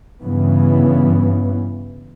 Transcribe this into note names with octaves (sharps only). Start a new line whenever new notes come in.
G2 C#3 E3 B3